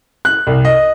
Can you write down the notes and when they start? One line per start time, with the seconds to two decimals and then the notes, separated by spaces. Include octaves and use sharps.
0.25 F#6
0.47 C2
0.65 D#5